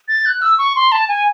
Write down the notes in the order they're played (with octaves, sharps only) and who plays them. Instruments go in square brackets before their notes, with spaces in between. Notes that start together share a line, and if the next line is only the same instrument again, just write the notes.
[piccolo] A6
F#6
E6
C#6
C6
A5
G#5